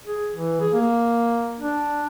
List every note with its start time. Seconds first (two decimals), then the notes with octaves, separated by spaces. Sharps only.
0.06 G#4
0.33 E3
0.60 G#4
0.73 A#3
1.60 D4